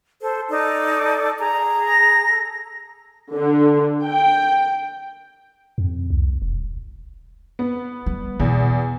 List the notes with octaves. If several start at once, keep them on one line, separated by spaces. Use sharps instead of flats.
A4 C5
D#4 A4 D5
G#4 A#5
A#6
A4
D3
G5
F2
C2
E1
B3
G3
E2 B2